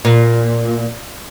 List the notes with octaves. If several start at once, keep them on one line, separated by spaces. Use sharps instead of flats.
A#2